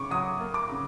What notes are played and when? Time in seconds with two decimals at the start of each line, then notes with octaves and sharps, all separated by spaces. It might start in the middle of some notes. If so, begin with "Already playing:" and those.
Already playing: C#3 C#6 D6
0.10 F#3 D#6
0.40 A#3
0.54 D6
0.69 C#3